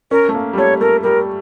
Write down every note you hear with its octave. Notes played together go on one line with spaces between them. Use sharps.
C#4 A#4
A3
A#3
G3
A3 C#5
A3 A#4
G3 A#4